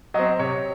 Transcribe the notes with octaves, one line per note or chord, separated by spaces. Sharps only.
F#3 C4 D#5
C3 C#5